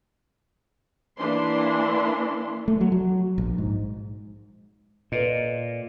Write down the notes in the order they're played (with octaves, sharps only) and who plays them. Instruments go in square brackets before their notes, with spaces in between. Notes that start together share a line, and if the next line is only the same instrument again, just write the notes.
[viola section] E3 A#3 D4 C6
[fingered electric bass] A3
F#3
F#3
A#1
G#2
[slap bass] A#2 [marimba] A4 B4 D#5